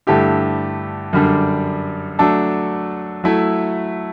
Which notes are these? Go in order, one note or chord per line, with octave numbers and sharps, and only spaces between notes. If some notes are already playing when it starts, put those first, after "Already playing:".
G2 D3 A3 E4 G4
F#2 D3 G3 D4
F#3 A3 D4 A4
F#3 A3 E4